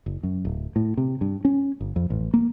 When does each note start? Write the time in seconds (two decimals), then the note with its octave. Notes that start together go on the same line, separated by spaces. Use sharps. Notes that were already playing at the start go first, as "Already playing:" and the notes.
0.06 F#1
0.23 F#2
0.45 D1
0.76 A2
0.97 C3
1.21 G2
1.45 C#4
1.81 G1
1.96 F2
2.10 A1
2.34 A#3